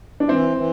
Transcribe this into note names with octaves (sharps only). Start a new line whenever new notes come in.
D4
E3 C4 E4
E3